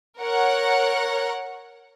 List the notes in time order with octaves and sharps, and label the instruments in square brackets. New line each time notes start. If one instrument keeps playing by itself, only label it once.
[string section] A#4 C#5 F#5